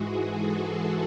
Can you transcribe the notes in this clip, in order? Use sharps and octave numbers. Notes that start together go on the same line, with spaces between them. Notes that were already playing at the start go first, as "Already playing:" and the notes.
Already playing: G#2 E3 G#3 F#4 G#4
A4
A4